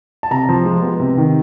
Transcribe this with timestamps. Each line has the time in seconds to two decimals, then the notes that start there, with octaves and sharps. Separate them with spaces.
0.23 A5
0.31 C3 A#5
0.49 F3
0.65 G#3
0.82 B3
1.00 C3
1.18 D#3